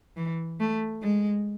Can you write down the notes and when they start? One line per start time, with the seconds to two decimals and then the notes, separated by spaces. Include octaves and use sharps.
0.17 E3
0.60 A3
1.02 G#3